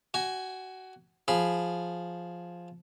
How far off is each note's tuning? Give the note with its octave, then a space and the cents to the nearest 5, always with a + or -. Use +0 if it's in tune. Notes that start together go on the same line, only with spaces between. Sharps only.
F#4 +20 G#5 +0
F3 +0 G#4 +0 B5 +0